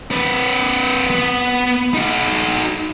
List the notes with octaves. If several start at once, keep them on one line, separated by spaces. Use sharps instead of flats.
C4 B4
B3
D#4 F#4